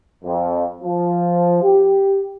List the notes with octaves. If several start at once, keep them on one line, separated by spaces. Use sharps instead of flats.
F2
F3
G4